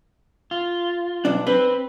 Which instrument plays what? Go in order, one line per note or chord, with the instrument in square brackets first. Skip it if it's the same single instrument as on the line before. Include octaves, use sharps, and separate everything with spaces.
[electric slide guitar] F4
[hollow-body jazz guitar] B1 D4
[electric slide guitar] C4 [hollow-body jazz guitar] B4